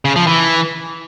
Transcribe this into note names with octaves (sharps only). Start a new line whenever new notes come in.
C#3
F3
E3